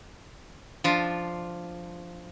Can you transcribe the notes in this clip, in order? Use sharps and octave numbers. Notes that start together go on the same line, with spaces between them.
F3 D4 F4